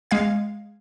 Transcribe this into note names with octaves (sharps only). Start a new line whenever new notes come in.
G#3 F5 G#6